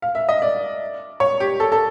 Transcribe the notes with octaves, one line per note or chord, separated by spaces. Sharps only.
F5
E5
D#5
D5
C#5
G4
A4
A4